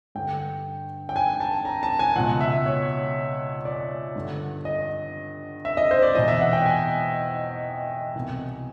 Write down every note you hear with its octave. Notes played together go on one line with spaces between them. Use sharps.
G2 D3 G5
G5
G#5
A5
A#5
A5
G#5
C#2 B2 F#5
E5
C#5
D5
G2 D3
D#5
E5
D#5
C5
D5
E2 B2 D#5
E5
F#5
G5
G#5
C2 B2